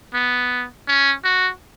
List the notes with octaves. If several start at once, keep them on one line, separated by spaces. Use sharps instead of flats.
B3
C#4
F#4